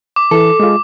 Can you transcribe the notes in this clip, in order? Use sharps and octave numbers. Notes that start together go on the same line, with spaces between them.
D6
E3 A4
G#3 F4